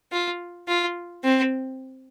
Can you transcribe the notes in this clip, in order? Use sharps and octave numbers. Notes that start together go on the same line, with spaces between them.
F4
F4
C4